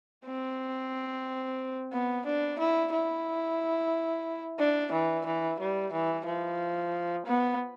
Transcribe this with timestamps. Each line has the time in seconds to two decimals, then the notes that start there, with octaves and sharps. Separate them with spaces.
0.25 C4
1.93 B3
2.26 D4
2.59 E4
2.93 E4
4.59 D4
4.92 E3
5.26 E3
5.59 G3
5.93 E3
6.26 F3
7.26 B3